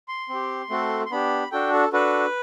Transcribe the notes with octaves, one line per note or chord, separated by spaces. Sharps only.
C6
C4 G4
A3 C4 F#4 A4
C6
B3 D4 G4 B5
D4 F#4 A4 G5
A4
D4 F#4 A4 B4